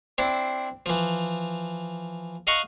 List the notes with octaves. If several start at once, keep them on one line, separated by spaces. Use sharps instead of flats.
C4 D4 E4 C5
E3 F3
D#5 F5 F#5 A#5 C#6